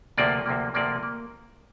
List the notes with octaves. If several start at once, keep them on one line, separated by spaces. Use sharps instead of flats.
D2 C3 F3 A#3 D5
D2 C3 F3 A#3
D2 C3 F3 A#3 D5
A#3